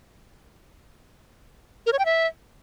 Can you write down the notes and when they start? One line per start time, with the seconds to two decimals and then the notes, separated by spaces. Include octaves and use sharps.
1.86 A#4
1.93 C#5
1.99 G5
2.05 E5